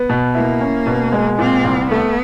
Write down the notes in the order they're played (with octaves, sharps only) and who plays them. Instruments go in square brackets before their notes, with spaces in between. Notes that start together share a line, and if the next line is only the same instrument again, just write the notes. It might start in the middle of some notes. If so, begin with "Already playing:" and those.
Already playing: [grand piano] B3
B2
[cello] A#3 [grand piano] E4
[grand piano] C#4
B2
G#3
[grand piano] A#2 [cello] C4
[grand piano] C2
[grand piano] A3 [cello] B3